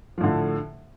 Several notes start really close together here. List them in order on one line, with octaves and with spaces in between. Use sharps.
F3 A2 D3